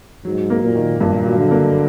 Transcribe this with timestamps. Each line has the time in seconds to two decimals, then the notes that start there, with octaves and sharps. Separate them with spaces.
0.25 G#2 F#3
0.50 A#3
0.63 A#2
0.76 D#3
1.00 G2 A#2
1.26 F#3
1.38 D3
1.51 A#3